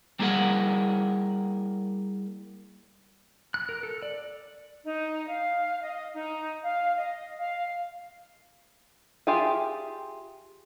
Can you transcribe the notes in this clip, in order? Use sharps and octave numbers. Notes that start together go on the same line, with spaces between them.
G3 A#3 E4 G#4 A#4 F#5
F#6
A#4
A4
D5
D#4
F5
D#5
D#4
F5
D#5
F5
F4 G4 G#4 E5 G#5